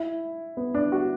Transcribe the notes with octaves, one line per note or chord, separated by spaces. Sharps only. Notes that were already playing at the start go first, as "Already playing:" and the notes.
Already playing: E4
B3
D4
F#4